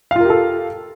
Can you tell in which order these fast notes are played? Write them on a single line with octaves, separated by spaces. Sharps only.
F5 F4 A#4 G4 A4